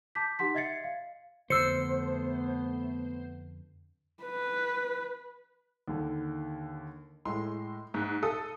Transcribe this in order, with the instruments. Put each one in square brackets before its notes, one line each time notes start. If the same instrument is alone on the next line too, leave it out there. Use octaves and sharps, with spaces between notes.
[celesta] A5 D6 G6 B6
D#4 G4 F#5 C6 B6
D#5 E5 G#6 A6 C7 C#7
F5
[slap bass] F2 D3 [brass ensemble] A3 B3 [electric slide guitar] C5 [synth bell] E6 C#7
[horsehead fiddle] B4
[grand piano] D#2 D3
[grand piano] A2 G#3 [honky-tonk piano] C6
[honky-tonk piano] G#2 [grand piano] F#6
[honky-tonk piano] A4 D#6